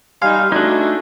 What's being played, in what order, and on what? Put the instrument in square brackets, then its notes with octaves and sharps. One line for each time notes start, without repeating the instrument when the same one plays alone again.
[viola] G3 D#4 [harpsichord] F5 [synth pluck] G#5 C6 F6
[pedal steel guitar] A3 D#4 [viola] D4 F#4 [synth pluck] F#6 G#6